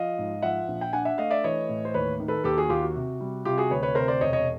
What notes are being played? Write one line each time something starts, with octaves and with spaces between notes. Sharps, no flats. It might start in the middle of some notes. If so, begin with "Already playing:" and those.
Already playing: F3 D#5 F5
G#2
F3 E5 F#5
A#1
G5
D4 F#5 G#5
E5 F#5
A3 D#5 F5
D5 E5
E3 C#5 D#5
A2
C5
D#2 B4 C#5
D#3
A4 B4
D#2 G4 A4
F#4 G#4
D#2 F4 G4
F#4
C3
G3
C3 F4 G4
F#4 G#4
D2 B4 C#5
B4 C#5
C3 A#4 C5
C5 D5
E1 C#5 D#5
C#5 D#5